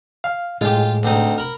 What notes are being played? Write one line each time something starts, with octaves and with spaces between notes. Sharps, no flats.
F5
A2 G#3 F4 G4
D2 C4 D#4
A#4 B5